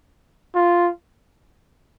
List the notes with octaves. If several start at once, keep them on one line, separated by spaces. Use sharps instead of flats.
F4